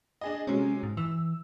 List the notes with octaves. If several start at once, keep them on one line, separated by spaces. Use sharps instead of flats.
D4 G#4 D#5
C3 F#3 G#3 C#4
G#2
E3 E6